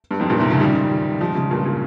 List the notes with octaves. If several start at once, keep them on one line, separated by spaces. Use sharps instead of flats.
G2
F2 G#2
G2 A#2
G#2 C3
C#3 F3
D#3 G3
F3 G#3
C#3 F3
G2 A#2
A#2